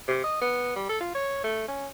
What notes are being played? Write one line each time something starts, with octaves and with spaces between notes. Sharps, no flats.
C3
D#5
B3
G3
A4
F4
C#5
A3
C#4